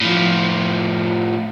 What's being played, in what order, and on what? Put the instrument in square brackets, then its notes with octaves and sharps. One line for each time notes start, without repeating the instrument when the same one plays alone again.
[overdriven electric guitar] A2 F3